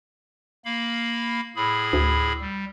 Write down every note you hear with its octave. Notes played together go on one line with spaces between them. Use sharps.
A#3 F5 B5
A2 G#4 B5
D2
G3